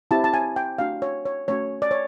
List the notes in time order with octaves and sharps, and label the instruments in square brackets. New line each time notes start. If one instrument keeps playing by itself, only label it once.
[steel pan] C4 E4 G4 A5
A5
G#5
G5
A3 D4 F#4 F5
C#5
C#5
A3 C#4 F#4 C#5
D5
C#5